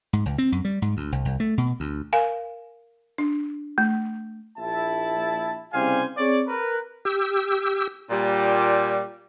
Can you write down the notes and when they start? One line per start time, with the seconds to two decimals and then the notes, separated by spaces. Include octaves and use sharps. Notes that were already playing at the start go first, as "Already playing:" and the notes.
0.13 G#2
0.26 C#2
0.38 C4
0.52 F#2
0.65 G3
0.82 G#2
0.97 D2
1.12 C2
1.25 C2
1.40 A3
1.58 B2
1.80 D2
2.13 A#4 F5 G#5
3.18 D4
3.78 A3
4.58 A#1 E4 A5
5.73 C2 C#3 G3 C5 F5 G#5
6.17 C4 G#4 C#5 D5
6.48 A#4 B4
7.05 G4 E6
8.11 A#2 G3